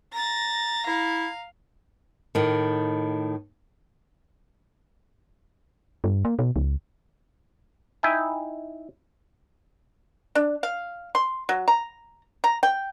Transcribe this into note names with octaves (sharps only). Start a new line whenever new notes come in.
A#5 A6 A#6
E4 F5
A2 D#3
G2
A#3
B2
C#2
D#4 E4 E5 G5 G#5
D4
F5
C6
F#3
A#5
A#5
G5